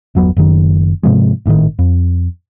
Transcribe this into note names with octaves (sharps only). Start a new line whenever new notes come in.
G1 E2 F#3 B3
F#1 F#2 D#3
G#2 C3 F3 G#3
G#1 A2 C3 D#3
F2